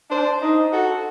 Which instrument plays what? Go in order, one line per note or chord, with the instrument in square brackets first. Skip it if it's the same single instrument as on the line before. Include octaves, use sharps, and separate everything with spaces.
[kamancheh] D4 [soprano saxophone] C5
[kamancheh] D#4
[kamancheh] F#4 [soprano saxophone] A4